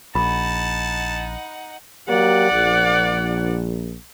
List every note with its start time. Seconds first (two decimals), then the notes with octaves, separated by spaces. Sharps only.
0.15 A#1 D#4 F#5 A5 B5
2.08 F#3 A#3 G4 D5 F#5
2.51 A#1